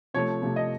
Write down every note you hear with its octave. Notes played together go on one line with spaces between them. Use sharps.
C3 F3 A3 C#5
C3 F3 A3
D#5